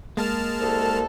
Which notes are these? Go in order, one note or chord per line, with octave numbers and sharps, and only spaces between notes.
G#3 A#3 A5 F6
C2 A4